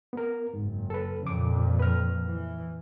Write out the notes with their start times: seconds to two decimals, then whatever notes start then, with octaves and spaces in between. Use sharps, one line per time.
0.13 B3 A#4
0.54 F#1 G#2
0.90 A4 B4
1.23 F2 A#2 C#3 D6
1.80 B4 F6
2.28 E3